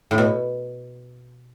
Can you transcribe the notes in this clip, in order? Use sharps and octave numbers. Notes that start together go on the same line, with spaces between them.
A2
B2